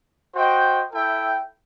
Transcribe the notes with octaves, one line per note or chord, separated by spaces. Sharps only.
F#4 C5 D#5 G5
E4 A4 E5 G5